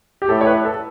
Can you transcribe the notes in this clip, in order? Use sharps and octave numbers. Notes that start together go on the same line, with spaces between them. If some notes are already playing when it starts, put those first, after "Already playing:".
G4
A2 A4
C#5
B4
A4